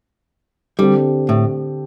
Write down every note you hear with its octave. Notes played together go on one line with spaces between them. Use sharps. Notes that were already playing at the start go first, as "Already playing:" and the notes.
D3 G3 C4 G4
A2